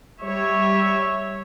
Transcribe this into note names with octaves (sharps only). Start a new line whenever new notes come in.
G3 C#5 E5